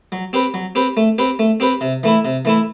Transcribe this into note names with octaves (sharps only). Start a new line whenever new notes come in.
F#3
C4 G4 B4
F#3
C4 G4 B4
A3
C4 G4 B4
A3
C4 G4 B4
C3
E3 A3 E4
C3
E3 A3 E4